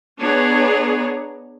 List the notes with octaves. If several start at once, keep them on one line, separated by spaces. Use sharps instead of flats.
B3 D4 G#4 C#5 A#5